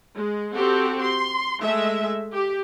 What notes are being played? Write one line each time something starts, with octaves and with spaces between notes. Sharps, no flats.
G#3
C4 F#4 G4 A4
C6
G#3 A3 E5
G4